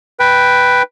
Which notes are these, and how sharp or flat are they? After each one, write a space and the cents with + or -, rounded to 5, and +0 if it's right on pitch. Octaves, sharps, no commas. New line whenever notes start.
B4 +0 G5 +0